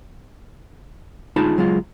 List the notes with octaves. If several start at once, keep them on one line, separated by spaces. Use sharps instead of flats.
D2 G#3 D#4 F4 A5 B5
C#2 F#3 G#3 F4